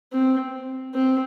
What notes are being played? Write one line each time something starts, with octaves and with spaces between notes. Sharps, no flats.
C4
C4